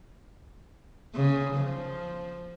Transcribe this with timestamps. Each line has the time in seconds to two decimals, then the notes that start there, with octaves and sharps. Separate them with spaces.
1.15 C#3
1.55 F3